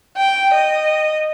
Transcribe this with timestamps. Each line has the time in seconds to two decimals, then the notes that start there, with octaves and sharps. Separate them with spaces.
0.17 G5
0.54 D#5